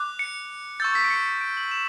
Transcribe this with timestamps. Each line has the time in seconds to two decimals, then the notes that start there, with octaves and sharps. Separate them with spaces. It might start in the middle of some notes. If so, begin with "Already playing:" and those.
Already playing: D6 F#6
0.19 C#7
0.80 C#6 E6 G6 A6
0.95 B6
1.04 D7
1.10 C#7
1.41 D7
1.57 F#7
1.71 E7